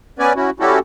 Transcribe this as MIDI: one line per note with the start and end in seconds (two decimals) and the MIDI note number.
0.19 0.33 59
0.19 0.33 61
0.19 0.33 71
0.19 0.33 74
0.19 0.33 80
0.35 0.50 61
0.35 0.50 64
0.35 0.50 66
0.60 0.79 55
0.60 0.79 61
0.60 0.79 64
0.60 0.79 66
0.60 0.79 67
0.60 0.79 69